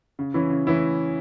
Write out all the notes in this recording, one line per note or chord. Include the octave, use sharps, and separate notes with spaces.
C#3
E3 C#4 E4
C#3
E3 C#4 E4